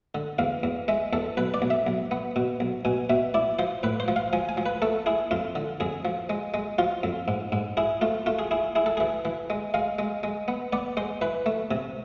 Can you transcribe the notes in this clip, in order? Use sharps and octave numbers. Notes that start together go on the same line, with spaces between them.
D3
E2 F5
E2
G#3 E5
E2 A4
B1 B4
D5
B1
E5
B1
B3
B2
B1
B2 G#5
B2 E5
E4 D5
F3 C5
A2 B4
C5
F3
F5
F3 G#5
G#5
F3
B4
A3 A4
E4 G#4
F2 F4
D3
F2 G#4
F3
G#3
G#3
F3 F4
F2
G#2
G#2
E4 G#4
A3 F4
A3 F4
G#4
E4 G#4
E4 G#4
A4
E3 G#4
E3
G#3
G#3 F5
G#3
G#3
B3
B3 D5
G#3 C5
E3 B4
A3
C3